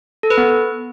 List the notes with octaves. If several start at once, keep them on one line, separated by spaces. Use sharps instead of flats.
A4
B4
B3